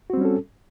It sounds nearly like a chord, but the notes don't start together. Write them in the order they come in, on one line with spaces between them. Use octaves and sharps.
F#4 C4 G3 C#4 A4